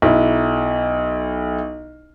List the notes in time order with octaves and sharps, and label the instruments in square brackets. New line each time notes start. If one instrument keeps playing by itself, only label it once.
[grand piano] B1 E4